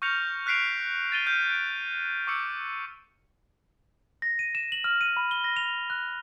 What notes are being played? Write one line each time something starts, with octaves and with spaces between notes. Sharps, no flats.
C#6 F6 G6 A#6 C#7 F7
F6 F#6 B6 C7 D7 F7
A6 D#7 G7
F6 G6 C7 D#7
D7
C#6 D6 E6 C#7
A#6
D#7
E7
F#7
F6
D#7
B5
G7
A#6
F7
F#6